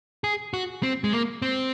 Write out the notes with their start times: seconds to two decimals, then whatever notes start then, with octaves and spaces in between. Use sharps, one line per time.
0.24 G#4
0.54 F#4
0.83 C4
1.04 G#3
1.13 A#3
1.42 C4